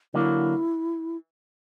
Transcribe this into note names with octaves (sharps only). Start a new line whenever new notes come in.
D3 F#3 A#3 E4